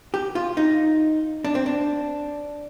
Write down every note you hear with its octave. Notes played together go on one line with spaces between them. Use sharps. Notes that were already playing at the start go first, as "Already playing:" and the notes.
G4
F4
D#4
D4
C4
D4